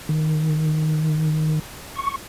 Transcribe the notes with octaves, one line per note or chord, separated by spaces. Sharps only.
D#3
C#6